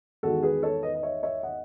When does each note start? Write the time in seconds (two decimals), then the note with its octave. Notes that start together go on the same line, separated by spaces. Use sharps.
0.23 E2 D#3 G#3 F#4 A4
0.43 G#4 B4
0.63 A4 C#5
0.83 B4 D#5
0.95 D#5
1.03 C#5 E5
1.23 C#5 E5
1.43 D#5 F#5